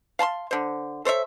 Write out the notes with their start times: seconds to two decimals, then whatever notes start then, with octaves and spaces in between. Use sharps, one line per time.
0.19 F5 A5 B5 C6
0.51 D3 C5
1.05 A4 C5 C#5 E5